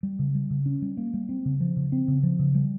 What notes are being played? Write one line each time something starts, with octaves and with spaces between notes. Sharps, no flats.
G3
C#3
G3
C#3
C#4
G3
A#3
G3
C4
C#3
F3
C#3
C4
C#3
F3
C#3
G3